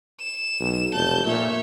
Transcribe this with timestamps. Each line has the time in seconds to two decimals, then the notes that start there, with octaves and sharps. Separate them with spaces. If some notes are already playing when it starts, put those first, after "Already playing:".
0.21 E7
0.60 B1
0.93 F1 A5 G6
1.26 A#2 C#5 E5